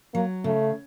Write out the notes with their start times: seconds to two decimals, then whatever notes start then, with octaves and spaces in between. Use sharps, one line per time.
0.14 F#3 A#3
0.44 C#3 A3